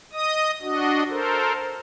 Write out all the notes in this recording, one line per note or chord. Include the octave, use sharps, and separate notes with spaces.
D#5 D#6
D4 F#4 D#5
A4 A#4 C5